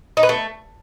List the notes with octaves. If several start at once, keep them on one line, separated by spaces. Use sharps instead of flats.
D#4
B4
A3